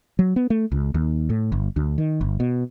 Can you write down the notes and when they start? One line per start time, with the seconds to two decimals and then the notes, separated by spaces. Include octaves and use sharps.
0.19 F#3
0.36 B3
0.50 A3
0.72 C#2
0.94 D#2
1.30 A2
1.52 G1
1.76 D2
1.98 D#3
2.21 G1
2.40 B2